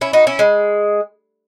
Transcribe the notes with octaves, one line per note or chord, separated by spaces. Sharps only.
C#4 E4
D#4 F#4
C#4 E4
G#3